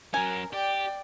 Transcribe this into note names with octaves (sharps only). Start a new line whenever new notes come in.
F#3 C#4 A#4 G#5
G4 D5 G5